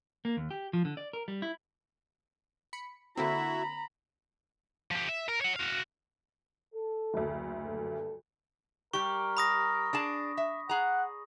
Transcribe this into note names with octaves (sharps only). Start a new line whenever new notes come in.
A#3
D#2
G4
F3
D3
D5
A#4
G3
E4
B5 C#7
D3 A#3 C4 E4 F#4 E5 A#5 B5
F3 G4
E5
A#4
C#5 F#5
F#4 F5
A4
F#1 D2
G2 A4
G3 G4 A#4 C#6
B5 D#6 A#6
D4 G#4 A5
E5
G#4 F#5 A#5